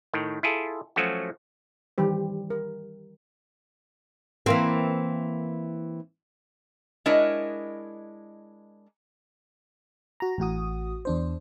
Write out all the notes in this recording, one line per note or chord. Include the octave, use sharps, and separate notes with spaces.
A2 D#3
E4 F4 G#4 A4
F3 F#3 A3 C#4 F#4
D#3 E3 G3 G4 C5
A#4
E3 A#3 C4
G#3 D4 E4 A#4 C#5 D#5
F#4 A#5
A1 A2 F#4 D#6
E2 D4 C5